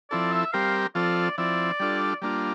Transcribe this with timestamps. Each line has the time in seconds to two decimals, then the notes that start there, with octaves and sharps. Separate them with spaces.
0.10 F3 C4 E4 A4 D5
0.31 E5
0.52 G3 C4 G4 A#4 F5
0.95 F3 C4 F4 A4 D5
1.37 F3 C4 E4 D5
1.80 G3 D4 F4 A4
2.22 G3 A#3 D4 F4